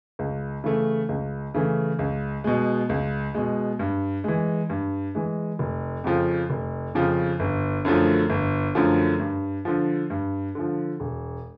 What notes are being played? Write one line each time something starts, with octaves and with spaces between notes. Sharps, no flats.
C#2
C#3 E3 A3
C#2
C#3 E3 A3
C#2
B2 G#3
C#2
B2 G#3
G2
E3 G#3
G2
E3 G#3
F1
F2 C#3 F3
F1
F2 C#3 F3
G1
F#2 D3 F3 A3
G1
F#2 D3 F3 A3
G2
D3 F3
G2
D3 F3
E1